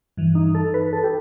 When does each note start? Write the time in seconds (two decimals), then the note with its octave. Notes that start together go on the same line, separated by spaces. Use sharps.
0.17 G2 E3
0.35 D#4
0.55 A4
0.74 B4
0.93 A4
1.04 G4